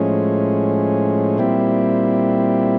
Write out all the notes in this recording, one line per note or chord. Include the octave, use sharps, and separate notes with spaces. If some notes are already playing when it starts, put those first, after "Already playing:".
Already playing: A2 F3 G#3 C#4
A#2 G3 C4 E4